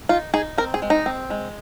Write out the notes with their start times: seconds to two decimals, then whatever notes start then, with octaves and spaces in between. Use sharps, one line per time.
0.09 D#4 F4
0.34 D#4 G#4
0.58 C4 A#4
0.74 G#4
0.82 G#3
0.90 D#4
1.06 C4
1.30 G#3